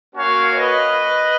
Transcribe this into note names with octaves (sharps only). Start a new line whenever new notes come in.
A#3 C#4 F#4 C#5 F5
B4 D#5